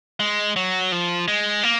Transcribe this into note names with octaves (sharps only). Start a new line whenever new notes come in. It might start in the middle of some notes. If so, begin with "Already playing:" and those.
G#3
F#3
F3
G#3
A#3